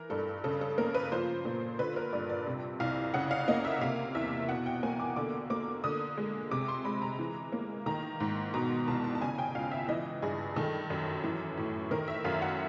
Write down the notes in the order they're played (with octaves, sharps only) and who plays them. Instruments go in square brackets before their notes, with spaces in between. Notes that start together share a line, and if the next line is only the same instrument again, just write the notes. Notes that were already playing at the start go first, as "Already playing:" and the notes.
Already playing: [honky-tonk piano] E3 A#4
G2 A4
C#3 A4
A4
A#3 A#4
B4
F3 C5
A#2
D3 B4
A#4
G2 D5
D5
C3
C2 F5
C#3 F#5
F5
A#3 D#5
E5
C3 F5
E2 E5
B2 F#5
G5
A#3 G#5
D6
D3 D6
A#3 D6
D3 D#6
G#3
C3 D6
C6
G#3 B5
A#5
E3
A#3
D#3 A#5
G#2
B2 A#5
C2 A5
A5
A5
C#3 G#5
G5
C#2 F5
E5
E3 D#5
G2 G#4
D#3 A4
F#2
E3
A2
D#3 A#4
E5
F#2 F5
F#5